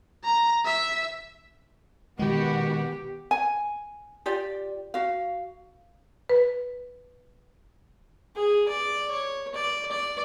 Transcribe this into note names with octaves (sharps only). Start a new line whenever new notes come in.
A#5
E5
B2 D#3 G#3 B3 F#4 G4
G#5
F4 G4 D5
F#4 F5
B4
G#4
D5
C#5
D5
D5